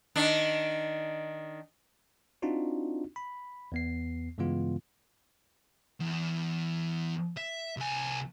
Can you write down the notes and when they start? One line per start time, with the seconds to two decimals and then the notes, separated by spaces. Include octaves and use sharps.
0.16 D#3 D4
2.42 C4 D4 D#4 F4 F#4
3.16 B5
3.72 E2 B3 C7
4.38 G2 C#3 E3 G#3 B3 F4
6.00 E2
7.37 E5
7.77 C2 G#5